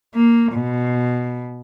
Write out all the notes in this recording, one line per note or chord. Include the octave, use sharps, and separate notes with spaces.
A#3
B2